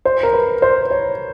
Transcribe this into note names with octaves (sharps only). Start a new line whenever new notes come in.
C5
A#4
B4
C5
C#5